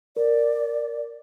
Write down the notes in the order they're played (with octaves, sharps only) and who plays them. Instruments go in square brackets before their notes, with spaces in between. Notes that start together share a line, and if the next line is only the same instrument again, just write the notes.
[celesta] A#4 [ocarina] D5